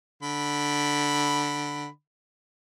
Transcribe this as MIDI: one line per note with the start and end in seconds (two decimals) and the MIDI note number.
0.23 1.88 50
0.23 1.88 83